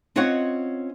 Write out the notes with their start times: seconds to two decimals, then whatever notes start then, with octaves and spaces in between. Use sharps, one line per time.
0.16 C4 C#4 F4 C#5 D#5 F#5